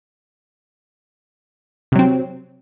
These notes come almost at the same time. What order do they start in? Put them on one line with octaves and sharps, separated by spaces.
C3 F#3 C4